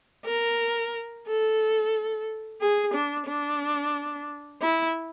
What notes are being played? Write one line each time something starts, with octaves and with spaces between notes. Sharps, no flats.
A#4
A4
G#4
D4
D4
E4